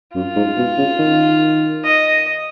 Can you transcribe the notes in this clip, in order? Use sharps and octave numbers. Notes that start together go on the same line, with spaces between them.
F#2 F4
G#2
B2
C#3
D#3
D#5